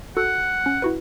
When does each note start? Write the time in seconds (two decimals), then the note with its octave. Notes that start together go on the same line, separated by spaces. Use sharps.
0.17 F#4 A4 F#5 E6
0.66 C#4
0.82 E4 F#4 B4